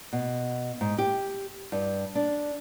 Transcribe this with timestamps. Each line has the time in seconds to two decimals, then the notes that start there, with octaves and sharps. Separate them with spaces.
0.13 B2
0.81 G#2
0.98 G4
1.72 G2
2.15 D4